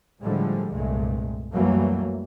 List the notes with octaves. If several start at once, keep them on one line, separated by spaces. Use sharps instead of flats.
A2 D3 F3 G3 G#3
C2 G2 A#2 G#3 A3
F#2 E3 F#3 G3 A3 A#3